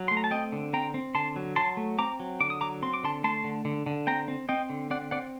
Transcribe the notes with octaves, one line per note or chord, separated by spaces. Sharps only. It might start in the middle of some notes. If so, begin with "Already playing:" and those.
Already playing: F#3
C6
A3
A#5
A5
C4 D#5 G5
D3
C4 G5 A#5
C4
D3 A5 C6
F#3
F#3 A5 C6
A3
C4 A#5 D6
F#3
D3 D6
D#6
F#3 A#5 D6
C4 C6
D6
D3 A5 C6
A3 A5 C6
D3
D3
D3
C4 G5 A#5
C4
C4 D#5 G5
D3
C4 D5 F#5
C4 D5 F#5